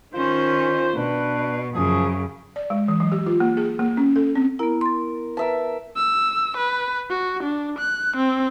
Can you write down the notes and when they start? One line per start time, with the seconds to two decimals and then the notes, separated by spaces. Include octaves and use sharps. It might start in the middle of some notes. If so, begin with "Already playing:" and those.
0.14 D#3 C#4 F4 C5
0.96 B2 D4 B4
1.74 F#2 C#3 F3 G#4
2.56 D5
2.70 G#3
2.88 E3
3.00 F#3
3.12 G4
3.26 F4
3.40 A#3
3.57 G#4
3.79 A#3
3.97 C#4
4.16 A4
4.35 C4
4.59 B3 E4 A#4
4.81 C6 A6
5.37 A#4 B4 E5 A5
5.96 E6
6.57 B4
7.10 F#4
7.43 D4
7.78 F#6
8.17 C4